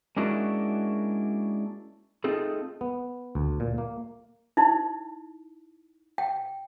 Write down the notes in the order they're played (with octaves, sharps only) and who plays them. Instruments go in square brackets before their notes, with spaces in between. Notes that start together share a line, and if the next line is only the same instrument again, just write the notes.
[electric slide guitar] G#3 A#3 C#4 D4 E4 F#4
A3 C4 D#4 F4 G#4 A4
[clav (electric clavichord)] B3
D2
A#2
A#3
[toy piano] D#4 E4
G5